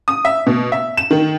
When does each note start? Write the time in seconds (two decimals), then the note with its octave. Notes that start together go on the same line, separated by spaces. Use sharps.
0.08 D#6
0.25 E5
0.47 B2
0.72 E5
0.97 E7
1.11 D#3